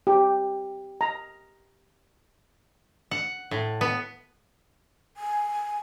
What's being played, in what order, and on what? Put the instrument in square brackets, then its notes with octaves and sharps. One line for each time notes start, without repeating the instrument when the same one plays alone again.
[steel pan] G4
A#5
[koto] F#5
A2
B3
[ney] G#5